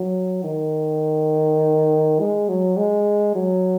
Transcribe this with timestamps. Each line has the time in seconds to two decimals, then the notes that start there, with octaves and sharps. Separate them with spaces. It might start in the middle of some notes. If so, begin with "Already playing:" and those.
Already playing: F#3
0.44 D#3
2.20 G#3
2.49 F#3
2.77 G#3
3.35 F#3